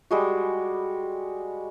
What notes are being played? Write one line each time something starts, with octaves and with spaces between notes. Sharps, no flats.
G3 G#3 F#4